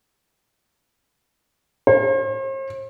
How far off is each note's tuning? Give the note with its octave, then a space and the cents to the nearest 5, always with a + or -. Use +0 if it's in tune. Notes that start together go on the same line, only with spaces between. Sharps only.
C5 +45